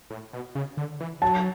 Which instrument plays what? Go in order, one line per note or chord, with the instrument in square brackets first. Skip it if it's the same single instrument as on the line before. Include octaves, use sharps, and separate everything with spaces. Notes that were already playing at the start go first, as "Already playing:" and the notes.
[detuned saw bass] A2
B2
C#3
D3
E3
[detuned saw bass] F#3 [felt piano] A5